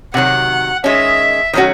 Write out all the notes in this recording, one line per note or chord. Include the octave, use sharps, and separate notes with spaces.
C3 D#3 F#3 F#5
D#3 G#3 C#4 E5
D#3 F#3 A3 C#4 F#4